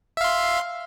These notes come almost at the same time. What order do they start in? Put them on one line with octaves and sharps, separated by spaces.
E5 F5 C6